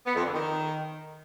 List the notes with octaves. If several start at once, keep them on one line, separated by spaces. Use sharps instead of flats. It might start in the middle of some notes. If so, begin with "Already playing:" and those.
B3
F2
D3
D#3